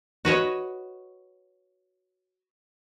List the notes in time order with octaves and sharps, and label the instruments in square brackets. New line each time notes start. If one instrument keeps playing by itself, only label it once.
[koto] F#4 B4 C#5 D#5